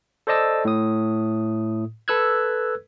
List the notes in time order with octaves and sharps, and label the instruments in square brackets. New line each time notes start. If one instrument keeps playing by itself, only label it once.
[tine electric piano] A4 C5 D5 D#5 A5 E6
A2 D#6
A4 B4 E6 F#6 G#6